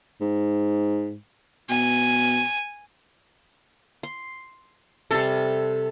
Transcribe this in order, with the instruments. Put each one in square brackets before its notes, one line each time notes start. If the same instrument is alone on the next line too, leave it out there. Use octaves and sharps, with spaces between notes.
[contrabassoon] G#2
[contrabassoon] B2 [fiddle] G#5
[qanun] C6
[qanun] C3 G3 [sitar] A4